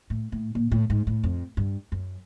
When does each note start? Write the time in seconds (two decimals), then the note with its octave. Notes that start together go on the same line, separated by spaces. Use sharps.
0.10 A2
0.32 A2
0.55 A#2
0.71 A2
0.90 G#2
1.07 A2
1.23 F2
1.57 G2
1.92 F#2